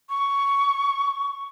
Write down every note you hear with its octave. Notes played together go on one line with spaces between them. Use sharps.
C#6